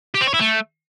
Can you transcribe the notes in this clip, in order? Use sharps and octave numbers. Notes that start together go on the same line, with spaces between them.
G4
C4
C#5
E4
A3